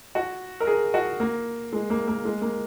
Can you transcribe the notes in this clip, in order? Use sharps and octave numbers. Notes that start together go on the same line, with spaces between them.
F#4
A#4
G#4
F#4
A#3
G#3
A#3
A#3
G#3
A#3